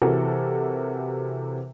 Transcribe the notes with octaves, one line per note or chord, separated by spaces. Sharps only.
C3 E3 F#4 A4 A#4